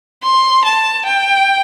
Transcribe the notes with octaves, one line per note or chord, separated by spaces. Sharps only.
C6
A5
G5